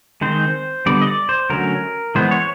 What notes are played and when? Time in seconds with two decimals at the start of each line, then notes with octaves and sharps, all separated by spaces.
0.21 D#3 G#3 C4 C5
0.86 D3 G3 B3 D5
1.02 D#5
1.07 D5
1.29 C5
1.50 D3 F#3 A3 C#4 A#4
2.15 E3 G#3 B3 C5
2.31 C#5